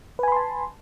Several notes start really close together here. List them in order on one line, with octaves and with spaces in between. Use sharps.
B4 G#5 B5 C6 A5